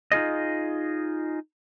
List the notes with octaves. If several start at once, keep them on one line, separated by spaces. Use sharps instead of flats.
D#4 F4 G#4 D#5